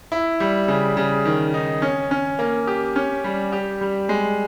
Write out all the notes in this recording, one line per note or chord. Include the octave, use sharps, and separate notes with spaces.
E4
G3
C#3
C#3
D#3
D#4
C#4
C#4
A#3
G4
C#4
G3
G4
G3
G#3